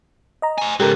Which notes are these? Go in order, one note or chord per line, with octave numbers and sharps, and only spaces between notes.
D#5 A#5
C5 G#5
C#2 G#2 G4 A4 A#4